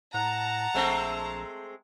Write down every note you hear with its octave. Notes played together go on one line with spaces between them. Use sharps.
A2 F#5 A5 A#5
A#1 G#3 A3 C4